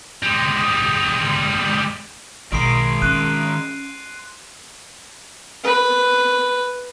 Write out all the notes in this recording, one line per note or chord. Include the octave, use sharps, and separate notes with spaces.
G3 G#3
B1 D#3 G#3 A#4 C7 D7
C#4 C6 F#6 D#7
B4